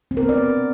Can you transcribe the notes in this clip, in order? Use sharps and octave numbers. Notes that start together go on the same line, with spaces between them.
C4
A#4
B3
D5